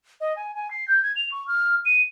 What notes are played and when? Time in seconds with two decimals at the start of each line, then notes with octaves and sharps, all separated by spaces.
0.20 D#5
0.36 G#5
0.55 G#5
0.71 C7
0.88 G6
1.03 G#6
1.16 F7
1.32 C#6
1.48 F6
1.85 D#7